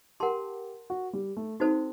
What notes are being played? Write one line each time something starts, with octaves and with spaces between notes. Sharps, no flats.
G4 A#4 F#5 A5 C6
F#4
G3
A3
C4 D#4 F#4 A4 C5